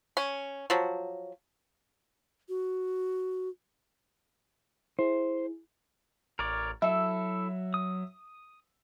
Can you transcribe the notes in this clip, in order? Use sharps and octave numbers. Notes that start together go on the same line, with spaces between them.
C#4
F3 F#3
F#4
E4 G#4 C5
A1 A#4 C#5 D5
F#3 E4 A4 E5
D#6